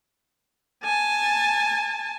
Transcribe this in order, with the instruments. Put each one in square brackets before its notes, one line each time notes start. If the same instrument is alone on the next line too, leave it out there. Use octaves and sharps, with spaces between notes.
[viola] G#5 A5